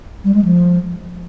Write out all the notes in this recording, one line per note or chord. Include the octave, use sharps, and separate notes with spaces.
G3
G#3
F3